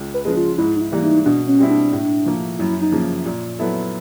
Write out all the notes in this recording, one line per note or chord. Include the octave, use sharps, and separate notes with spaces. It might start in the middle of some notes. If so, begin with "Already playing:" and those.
Already playing: C#2
B4
C#3 F3 G#3
F4
G#2 E4
D#4
E4
E3 G3 A#3
D#4
B2 D4
C#4
G3 C4 E4
D4
A2
F3 A#3
F#2 E4
D#4
C#3 F3 A#3
A#2
F#3 B3 E4 A4